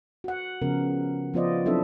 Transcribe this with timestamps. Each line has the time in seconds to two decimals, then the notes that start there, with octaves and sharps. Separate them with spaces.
0.24 F#4 F#5
0.62 C#3 F3 B3 A#4
1.34 F3 B3 F4 C5 D5 D#5
1.66 F#3 C4 D4 E4 A4 E5